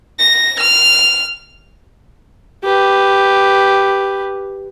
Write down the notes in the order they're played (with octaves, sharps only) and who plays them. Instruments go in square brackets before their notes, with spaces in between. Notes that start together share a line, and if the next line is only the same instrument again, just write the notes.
[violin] A#6
F6
[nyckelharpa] G4 B4